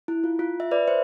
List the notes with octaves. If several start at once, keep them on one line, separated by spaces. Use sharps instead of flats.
E4
F4
F4
E5
B4 D5
C5 E5